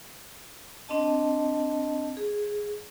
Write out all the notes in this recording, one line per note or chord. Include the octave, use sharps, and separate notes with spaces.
C4 D4 D#5 A5
G#4